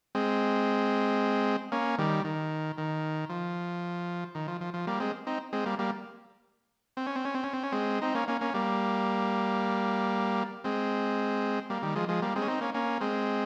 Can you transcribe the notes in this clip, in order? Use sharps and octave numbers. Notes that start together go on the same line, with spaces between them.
G#3 C4
A#3 C#4
D#3 G3
D#3
D#3
F3
D#3
F3
F3
F3
G3 A#3
G#3 C4
C4 D#4
G#3 C4
G3 A#3
G3 A#3
C4
C#4
C4
C#4
C4
C#4
C4
C#4
G#3 C4
C4 D#4
A#3 C#4
A#3 C#4
A#3 C#4
G3 A#3
G#3 C4
G3 A#3
D#3 G3
F3 G#3
F3 G#3
G3 A#3
G#3 C4
C#4
C4 D#4
A#3 C#4
A#3 C#4
G#3 C4